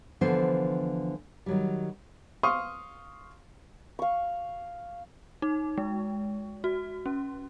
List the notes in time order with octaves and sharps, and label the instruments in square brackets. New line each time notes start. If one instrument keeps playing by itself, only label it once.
[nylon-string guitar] D3 E3 F3 B3 C5
D#3 F#3 G3
[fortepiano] F5 C6 C#6 D#6
[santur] F5 C#6
[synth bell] D#4
G#3
F#4
C#4